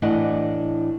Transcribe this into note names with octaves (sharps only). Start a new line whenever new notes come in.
A2 E3 D4 D5 D#5 F#5